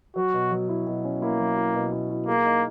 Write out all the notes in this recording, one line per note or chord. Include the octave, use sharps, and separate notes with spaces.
F#3 F#4
B2
F#3
E4
B2
C#4
A#3 E4
F#3
E4
B2
E4
E4
A#3 G#4
D#4